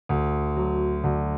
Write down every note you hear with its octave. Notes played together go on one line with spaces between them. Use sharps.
D2
F#3
D2